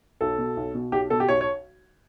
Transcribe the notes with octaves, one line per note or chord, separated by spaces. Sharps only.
B1 A4
B2
B1
B2
B1 G4
B2 A4
G4
B1 C#5
C#5